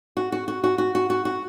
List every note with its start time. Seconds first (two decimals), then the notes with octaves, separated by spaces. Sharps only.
0.17 F#4
0.32 F#4
0.48 F#4
0.64 F#4
0.78 F#4
0.95 F#4
1.10 F#4
1.25 F#4